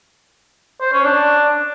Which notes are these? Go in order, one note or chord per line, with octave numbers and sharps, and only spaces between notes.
C5
C#4
D4